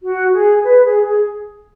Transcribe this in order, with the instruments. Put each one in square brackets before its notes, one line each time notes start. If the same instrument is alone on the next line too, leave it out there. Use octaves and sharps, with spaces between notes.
[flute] F#4
G#4
B4
G#4
G#4